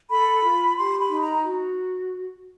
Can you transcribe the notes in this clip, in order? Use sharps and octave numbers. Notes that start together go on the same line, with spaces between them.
A4 B5
F4
G4 C6
B5
D#4
A#5
F#4